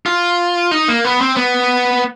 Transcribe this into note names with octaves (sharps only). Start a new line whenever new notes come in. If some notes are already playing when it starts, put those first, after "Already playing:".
F4
D#4
A#3
B3
C4
B3